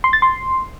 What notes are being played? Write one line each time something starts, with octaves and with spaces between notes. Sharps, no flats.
C6
A6
C6